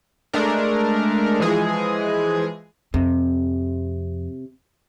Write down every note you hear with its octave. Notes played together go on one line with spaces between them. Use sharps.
G#3 A3 D4 A#4
E3 F3 G#3 G#4
F2 C3